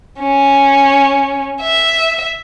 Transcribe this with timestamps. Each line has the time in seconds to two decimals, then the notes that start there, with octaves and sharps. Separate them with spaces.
0.20 C#4
1.61 E5